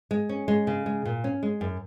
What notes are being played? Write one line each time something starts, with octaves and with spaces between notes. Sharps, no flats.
G#3
C#4
G#3
C#3
G#3
A#2
C#4
G#3
F#2